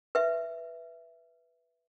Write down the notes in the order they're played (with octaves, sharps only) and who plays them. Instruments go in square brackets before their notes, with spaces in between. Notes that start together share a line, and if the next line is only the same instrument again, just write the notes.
[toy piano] B4 E5